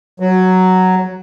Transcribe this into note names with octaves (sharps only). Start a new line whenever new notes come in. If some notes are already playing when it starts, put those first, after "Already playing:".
F#3